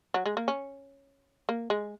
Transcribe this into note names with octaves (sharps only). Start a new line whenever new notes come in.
F#3
G#3
A#3
C#4
A#3
G#3